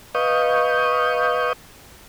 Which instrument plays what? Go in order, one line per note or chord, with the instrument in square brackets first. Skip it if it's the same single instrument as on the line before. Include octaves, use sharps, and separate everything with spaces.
[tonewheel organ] B4 D#5 F5 C#6 D#6 G6